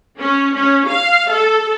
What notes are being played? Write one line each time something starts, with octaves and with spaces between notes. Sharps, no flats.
C#4
C#4
F5
A4